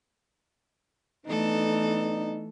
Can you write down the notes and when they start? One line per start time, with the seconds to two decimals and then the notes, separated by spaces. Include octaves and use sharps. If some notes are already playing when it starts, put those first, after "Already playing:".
1.26 E3 A3 B3 D4 D#4 A4